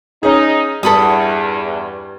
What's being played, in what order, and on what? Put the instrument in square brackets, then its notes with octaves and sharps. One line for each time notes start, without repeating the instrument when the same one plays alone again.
[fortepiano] C#4 G#4 [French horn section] D#4
[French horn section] E2 [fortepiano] G2 [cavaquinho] A4 B5 D#6